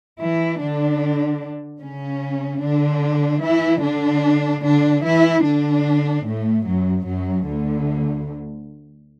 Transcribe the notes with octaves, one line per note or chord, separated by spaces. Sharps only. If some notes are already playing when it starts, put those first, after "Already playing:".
E3 E4
D3 D4
C#3 C#4
D3 D4
E3 E4
D3 D4
D3 D4
E3 E4
D3 D4
A2 A3
F#2 F#3
F#2 F#3
D2 D3